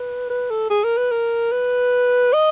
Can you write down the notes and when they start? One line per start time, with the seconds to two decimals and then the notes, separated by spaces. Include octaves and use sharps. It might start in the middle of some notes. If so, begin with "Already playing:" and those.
Already playing: B4
0.30 B4
0.50 A4
0.70 G#4
0.84 A#4
0.97 B4
1.11 A#4
1.52 B4
2.33 D#5